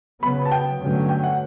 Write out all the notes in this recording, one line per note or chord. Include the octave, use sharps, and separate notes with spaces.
C#3 F#3 B3 B5
A5
G5
G2 D3 F#3 A3 C#4
G5
F#5